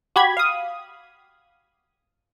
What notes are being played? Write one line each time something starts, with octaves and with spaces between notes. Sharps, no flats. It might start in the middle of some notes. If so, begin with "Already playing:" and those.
F#4 G4 B5 G#6
F5 D#6